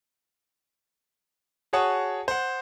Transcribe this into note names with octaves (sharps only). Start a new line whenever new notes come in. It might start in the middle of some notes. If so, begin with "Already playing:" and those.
F#4 G#4 C#5 F#5 A5 D#6
C5 F#5